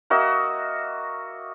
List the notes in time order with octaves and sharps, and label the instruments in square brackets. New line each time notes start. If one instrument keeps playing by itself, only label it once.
[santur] A#3 F#4 D#5 E5